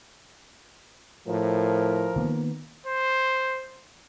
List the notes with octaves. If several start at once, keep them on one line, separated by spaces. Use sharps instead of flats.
A2 F3 A#4
D#3 A#3 B3
C5